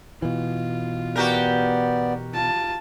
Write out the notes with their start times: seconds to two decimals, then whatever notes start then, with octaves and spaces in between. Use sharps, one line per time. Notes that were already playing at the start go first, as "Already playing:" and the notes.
0.22 B2 E3 F4
1.16 B3 F#4 G4 A#4 D5
2.34 F4 A5